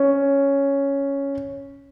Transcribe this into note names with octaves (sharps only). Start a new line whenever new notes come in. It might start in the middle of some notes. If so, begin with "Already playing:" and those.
Already playing: C#4